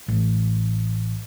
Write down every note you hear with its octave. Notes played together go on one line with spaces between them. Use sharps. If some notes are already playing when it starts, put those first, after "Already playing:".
A1